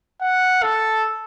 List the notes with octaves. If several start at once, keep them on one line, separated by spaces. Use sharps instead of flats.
F#5
A4